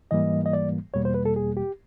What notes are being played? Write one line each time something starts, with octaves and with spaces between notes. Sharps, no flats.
G#2 E3 G3 A#3 D#5
D#5
D5
E2 B2 G3 A#3 C#5
C5
B4
A4
G#4
G4